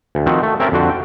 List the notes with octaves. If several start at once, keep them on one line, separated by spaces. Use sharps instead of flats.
D2
D#3 F3 C4 F#4
A3
C4 C#4 A#4 E5 G5 A5
F2 D3 F#4 C5
G5